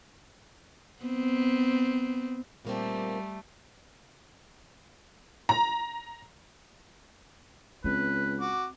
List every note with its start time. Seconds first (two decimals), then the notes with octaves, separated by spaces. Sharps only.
1.03 B3 C4
2.65 A#2 G3 A3 A#3 C4
5.49 A#5
7.84 C#2 C4 B4
8.40 F#4 D6